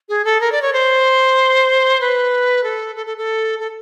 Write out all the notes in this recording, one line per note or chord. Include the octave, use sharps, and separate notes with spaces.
G#4
A4
A#4
D5
C#5
C5
B4
A4
A4
A4
A4
A4